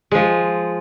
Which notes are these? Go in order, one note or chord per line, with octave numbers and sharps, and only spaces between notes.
F3 G#3